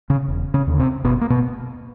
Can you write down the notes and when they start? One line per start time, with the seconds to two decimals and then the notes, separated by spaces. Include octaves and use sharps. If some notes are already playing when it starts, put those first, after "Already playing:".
0.10 C#3 C#4
0.28 E1
0.54 C#3 C#4
0.67 D#2 D3
0.79 C3 C4
1.04 F#1 B2 B3
1.21 A#3
1.30 B2 B3